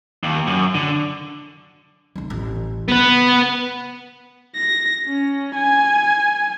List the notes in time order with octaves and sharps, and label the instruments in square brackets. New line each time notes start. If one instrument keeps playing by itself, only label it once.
[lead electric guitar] D#2
F#2
D3
[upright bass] F1 D2
A1
[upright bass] C#3 [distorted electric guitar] B3 B4
[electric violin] A#6
C#4
G#5